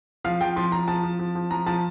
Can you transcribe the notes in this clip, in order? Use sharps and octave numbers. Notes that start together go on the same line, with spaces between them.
F3 F5
F3 G5
F3 C6
F3 A#5
F3 A5
F3
F3
F3
F3 A#5
F3 A5